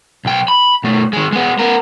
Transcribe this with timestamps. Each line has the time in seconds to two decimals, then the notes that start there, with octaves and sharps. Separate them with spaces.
0.25 B1 G5
0.48 B5
0.84 B2 A3
1.13 D#3 G#3
1.33 G#3 B3
1.59 B3 A#4